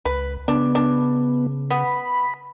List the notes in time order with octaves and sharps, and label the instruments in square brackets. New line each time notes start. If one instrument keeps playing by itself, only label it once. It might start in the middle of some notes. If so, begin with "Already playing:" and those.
[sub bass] C#2 [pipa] B4
[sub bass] C#3 [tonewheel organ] B3 [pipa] D4
[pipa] D4
[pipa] B3 [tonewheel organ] B5